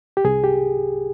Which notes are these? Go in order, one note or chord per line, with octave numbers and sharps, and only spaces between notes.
G4
C2 G#4
G4